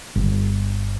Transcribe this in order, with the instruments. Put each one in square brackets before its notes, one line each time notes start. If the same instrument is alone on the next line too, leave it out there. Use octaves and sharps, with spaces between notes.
[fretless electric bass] G1